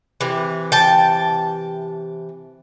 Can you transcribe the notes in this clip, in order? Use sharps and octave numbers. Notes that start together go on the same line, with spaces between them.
C3 E3
G5 A5